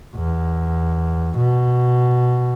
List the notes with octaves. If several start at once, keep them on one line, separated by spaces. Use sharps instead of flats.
E2
B2